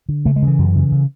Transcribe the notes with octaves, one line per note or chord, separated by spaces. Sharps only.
D3
C#3 A3
G#3
C#3
E3
F#2
C#3
C#3